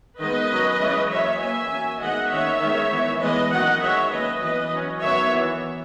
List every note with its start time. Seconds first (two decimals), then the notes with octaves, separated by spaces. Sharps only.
0.20 D#3 G#3 B3 B4 D#5
0.51 F#3 C#4
0.80 E3 G#3 C#4
1.10 F#3 A#3 C#4 C#5 E5
1.40 E3 A#3 C#4 E5 G#5
1.71 F#3 A#3 C#4
2.01 D#3 G#3 B3 D#5 F#5
2.31 D#3 A#3 C#4 C#5 E5
2.61 D#3 G#3 B3
2.91 E3 B3
3.21 E3 G#3 B3 B4 D#5
3.52 D#3 F#3 A#3 C#4 D#5 F#5
3.82 D#3 G#3 C#4 C#5 E5
4.12 F#3 A#3 C#4 B4 D#5
4.43 E3 B3 B4 D#5
4.72 F#3 C#4
5.03 D#3 F#3 B3 C#5 E5
5.32 E3 B3